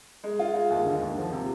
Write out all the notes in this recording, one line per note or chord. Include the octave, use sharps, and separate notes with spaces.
G#3
F4
G#3
D#2
D3
D#2
F3
C3